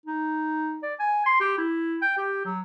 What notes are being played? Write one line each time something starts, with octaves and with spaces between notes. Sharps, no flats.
D#4
D5
G#5
C6
G4
E4
G5
G4
F#3